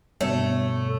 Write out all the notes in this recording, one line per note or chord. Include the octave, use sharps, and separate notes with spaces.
G2 B2 D3 A3 C#5